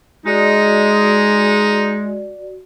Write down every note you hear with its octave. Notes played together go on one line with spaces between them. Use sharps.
G#3 D#4 F#4 D5